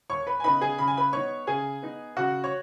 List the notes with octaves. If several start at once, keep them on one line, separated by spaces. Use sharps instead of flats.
D#2 C#5 C#6
B4 B5
G#5
C#3 B3 D#4 B4 B5
G#4 G#5
C#3 B5
G#5
B4 B5
B3 D#4 C#5 C#6
C#3 G#4 G#5
B3 D#4
C#3 F#4 F#5
C#5